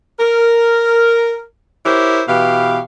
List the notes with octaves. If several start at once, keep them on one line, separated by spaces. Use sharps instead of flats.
A#4
E4 G4 A#4 C5 C#5
B2 E3 G4 F5